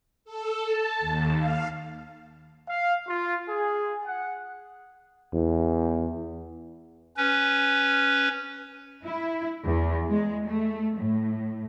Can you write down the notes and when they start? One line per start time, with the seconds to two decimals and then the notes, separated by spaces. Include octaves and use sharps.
0.25 A4
0.65 A5
1.00 D#2
1.37 F5
2.68 F5
3.08 F4
3.49 G#4
4.06 F#5
5.34 E2
7.17 C#4 B4
9.04 E4
9.65 E2
10.09 G#3
10.48 A3
10.97 A2